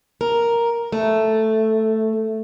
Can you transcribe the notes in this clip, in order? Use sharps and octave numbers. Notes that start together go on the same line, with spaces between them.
A#4
A3